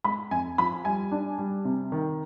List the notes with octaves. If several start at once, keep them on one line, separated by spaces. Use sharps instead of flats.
G#3 B5
F2 G#5
F3 B5
G3 G#5
D4
G3
C3
D#3